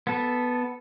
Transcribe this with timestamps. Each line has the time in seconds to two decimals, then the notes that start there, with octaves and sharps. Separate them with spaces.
0.07 B3 A4